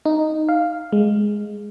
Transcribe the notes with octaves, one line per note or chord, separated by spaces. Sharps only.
D#4
F5
G#3